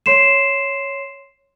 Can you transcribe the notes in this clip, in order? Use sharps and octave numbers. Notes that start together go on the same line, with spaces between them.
C#5 C6 C7 E7